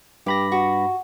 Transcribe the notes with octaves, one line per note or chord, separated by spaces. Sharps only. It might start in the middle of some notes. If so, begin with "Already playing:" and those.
G2 G4 B5 A#6
F#4